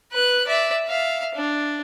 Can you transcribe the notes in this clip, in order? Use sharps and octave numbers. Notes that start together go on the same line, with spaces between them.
B4 F#6
D5 E5
E5 F5
D4